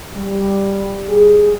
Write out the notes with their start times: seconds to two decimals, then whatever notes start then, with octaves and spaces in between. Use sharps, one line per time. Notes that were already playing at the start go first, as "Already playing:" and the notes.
0.16 G3
1.09 G#4